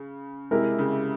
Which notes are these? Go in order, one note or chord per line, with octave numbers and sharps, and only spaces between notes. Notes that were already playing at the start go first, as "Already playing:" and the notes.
Already playing: C#3
C3 G#3 E4 A#4
C#3